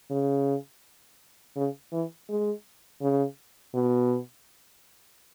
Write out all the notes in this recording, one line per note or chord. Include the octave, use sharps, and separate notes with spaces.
C#3
C#3
E3
G#3
C#3
B2